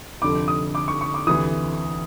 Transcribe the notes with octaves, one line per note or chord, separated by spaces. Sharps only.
F1 F2 D3 D6
D#6
D6
C#6
C#6
D6
D2 C3 E3 D#6